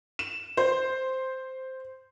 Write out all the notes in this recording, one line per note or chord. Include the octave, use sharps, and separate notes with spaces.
E7
C5